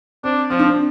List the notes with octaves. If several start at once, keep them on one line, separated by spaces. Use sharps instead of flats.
C4 D4
F3 C4
D4
C4